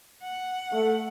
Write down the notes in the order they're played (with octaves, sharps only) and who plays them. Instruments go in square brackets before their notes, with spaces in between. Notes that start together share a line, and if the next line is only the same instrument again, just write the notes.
[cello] F#5
[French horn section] A3